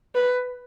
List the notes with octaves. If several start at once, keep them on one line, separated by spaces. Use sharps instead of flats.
B4